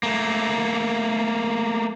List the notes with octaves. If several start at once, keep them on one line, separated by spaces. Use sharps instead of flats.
A3 A#3